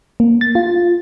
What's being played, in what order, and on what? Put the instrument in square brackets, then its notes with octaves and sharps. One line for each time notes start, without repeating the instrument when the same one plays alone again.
[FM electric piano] A#3
A6
F4